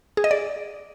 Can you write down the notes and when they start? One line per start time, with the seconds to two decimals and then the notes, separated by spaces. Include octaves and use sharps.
0.17 G#4
0.24 D#5
0.31 D5